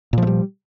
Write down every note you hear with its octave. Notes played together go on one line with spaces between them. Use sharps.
A#2 F3 G3 A3